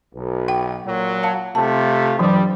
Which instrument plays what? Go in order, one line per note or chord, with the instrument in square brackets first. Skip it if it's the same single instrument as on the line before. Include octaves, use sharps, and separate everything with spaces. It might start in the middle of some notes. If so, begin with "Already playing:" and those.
[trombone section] B1
[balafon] G5
[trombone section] A#2 F#3
[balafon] F5 A5
[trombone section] C3 A3 F4 [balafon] A5
[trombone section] G2 G3 [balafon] E3 F#3